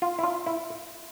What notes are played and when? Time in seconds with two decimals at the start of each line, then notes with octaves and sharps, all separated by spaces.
0.02 F4
0.19 E4
0.23 F4
0.46 E4